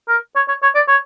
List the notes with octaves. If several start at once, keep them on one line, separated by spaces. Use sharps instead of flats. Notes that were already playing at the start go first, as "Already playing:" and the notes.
A#4
C#5
C#5
C#5
D5
C#5